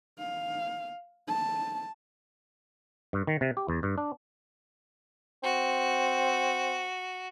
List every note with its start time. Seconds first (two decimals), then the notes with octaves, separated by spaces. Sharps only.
0.19 F5
1.28 A5
3.13 G2
3.27 D#3
3.41 C3
3.57 G4
3.68 E2
3.83 G2
3.98 D4
5.43 C4 F#4